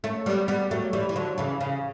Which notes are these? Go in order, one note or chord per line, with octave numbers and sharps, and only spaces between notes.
A3 C#4
G3 B3
G3 B3
F#3 A3
E3 G3
E3
D3 F#3
C#3 E3
C#3